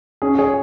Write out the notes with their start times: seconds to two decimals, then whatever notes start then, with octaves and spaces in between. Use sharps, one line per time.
0.22 C#4 G#4
0.38 G#4 C#5